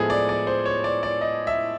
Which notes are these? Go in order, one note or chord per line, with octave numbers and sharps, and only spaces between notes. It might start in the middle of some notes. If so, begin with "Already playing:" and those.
Already playing: A2 F3 G#3 B3 G#4 A4
D5
D5
C5
C#5
D5
D5
D#5
E5